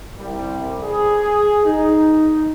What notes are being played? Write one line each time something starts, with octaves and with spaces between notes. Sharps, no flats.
C2 G3
G#4
D#4